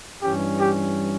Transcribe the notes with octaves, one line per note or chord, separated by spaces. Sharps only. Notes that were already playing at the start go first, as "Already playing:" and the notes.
G2 E3 G3 C#4 G4
G4